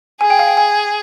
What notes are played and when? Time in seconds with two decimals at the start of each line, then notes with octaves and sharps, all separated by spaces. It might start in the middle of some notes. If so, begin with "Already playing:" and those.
0.21 G#4 G#5
0.30 G5
0.39 F5
0.48 G5
0.57 G#5